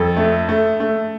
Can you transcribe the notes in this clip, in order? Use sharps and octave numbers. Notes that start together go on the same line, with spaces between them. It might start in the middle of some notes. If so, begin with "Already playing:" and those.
Already playing: F2 A4
A3
A3
A3